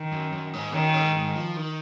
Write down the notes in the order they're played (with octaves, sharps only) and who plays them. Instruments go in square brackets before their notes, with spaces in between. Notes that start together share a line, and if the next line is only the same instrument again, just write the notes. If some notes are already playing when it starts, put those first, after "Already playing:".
Already playing: [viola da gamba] D#3
[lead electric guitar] F#2
F#2
G#2
[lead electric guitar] F#2 [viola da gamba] D#3
[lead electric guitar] G#2
G#2
F3
D#3